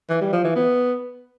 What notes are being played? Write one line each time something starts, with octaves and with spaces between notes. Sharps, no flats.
E3
G3
F3
E3
B3